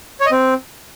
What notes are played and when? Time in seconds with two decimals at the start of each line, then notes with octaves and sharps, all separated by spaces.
0.20 C#5
0.26 D#5
0.32 C4